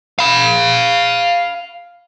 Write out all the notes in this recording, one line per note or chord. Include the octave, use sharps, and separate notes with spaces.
F5 B5